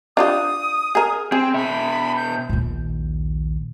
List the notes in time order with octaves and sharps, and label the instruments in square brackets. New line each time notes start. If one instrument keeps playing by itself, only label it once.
[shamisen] D4 F4 G4 [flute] D#6
[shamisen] G#4 A#4
[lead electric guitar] C4 [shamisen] G#4 [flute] G5
[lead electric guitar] B2 E5 [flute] B5
[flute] G6
[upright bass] A#1 D#2